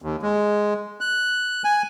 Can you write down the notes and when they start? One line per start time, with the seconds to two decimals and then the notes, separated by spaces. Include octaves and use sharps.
0.02 D#2
0.22 G#3
1.01 F#6
1.64 G#5